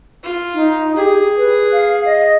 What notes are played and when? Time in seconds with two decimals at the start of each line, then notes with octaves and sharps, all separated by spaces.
0.24 F4
0.54 D#4
0.96 G4 G#4
1.37 B4
1.72 F5
2.05 D#5